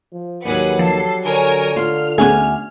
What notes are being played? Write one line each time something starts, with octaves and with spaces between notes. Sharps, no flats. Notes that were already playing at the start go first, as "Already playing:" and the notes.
F3
D#2 F#3 G3 G#4 B4 F#5
F3 A4 C7
D3 A#4 C#5 G#5
F4 F6
D2 B3 C#4 G#4 F#5 G#5